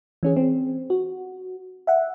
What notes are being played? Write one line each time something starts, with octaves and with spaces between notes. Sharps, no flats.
E3 C#4 G#4
C4
F#4
E5 F#5